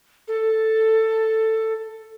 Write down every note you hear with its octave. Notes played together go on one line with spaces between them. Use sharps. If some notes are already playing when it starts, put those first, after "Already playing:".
A4